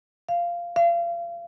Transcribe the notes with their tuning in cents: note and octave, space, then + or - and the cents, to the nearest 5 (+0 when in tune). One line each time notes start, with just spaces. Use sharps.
F5 -10
F5 -35